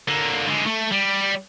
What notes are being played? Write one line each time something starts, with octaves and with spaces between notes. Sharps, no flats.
D3 A#3
D3 G#3
A3
G3